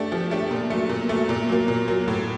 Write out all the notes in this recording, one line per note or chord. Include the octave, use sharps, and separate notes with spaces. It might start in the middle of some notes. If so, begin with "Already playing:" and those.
Already playing: A3 D4 G4
F3
A3 D4 G4
A#2
F#3 A3
A#2
F#3 A3
A#2
F#3 A#3
A#2
F#3 A#3
A2